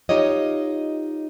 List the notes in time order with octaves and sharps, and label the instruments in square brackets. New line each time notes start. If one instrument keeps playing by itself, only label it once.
[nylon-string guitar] D#4 F4 G4 C#5 D#5